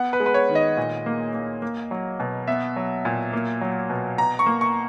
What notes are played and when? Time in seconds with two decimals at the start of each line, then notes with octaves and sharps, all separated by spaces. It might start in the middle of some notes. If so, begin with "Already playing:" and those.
Already playing: B3 F#5
0.13 B4
0.20 G#3
0.26 B4
0.34 C#5
0.49 D#3
0.55 D#5
0.77 A#2
1.06 A#3
1.34 A#3
1.62 A#3
1.91 F#3
2.20 B2
2.47 B3 E5
2.76 F#3
3.05 A#2
3.33 A#3
3.61 F#3
3.90 B2
4.18 B2 A#5
4.39 C#6
4.46 A#3
4.61 C#6